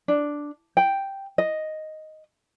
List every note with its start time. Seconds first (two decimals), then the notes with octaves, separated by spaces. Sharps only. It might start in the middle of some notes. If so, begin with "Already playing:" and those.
0.08 D4
0.77 G5
1.38 D#5